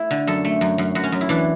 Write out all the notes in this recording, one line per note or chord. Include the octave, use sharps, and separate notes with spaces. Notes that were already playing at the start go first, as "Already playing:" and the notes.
Already playing: A3 E4
D3
F#2 A4
A3
F#2
F#2
F#2 F#4
C#4
F#2
E4
E3 D4